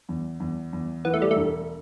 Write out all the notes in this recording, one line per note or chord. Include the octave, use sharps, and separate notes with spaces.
E2
E2
E2
E3 B3
A3
G3
A3
E1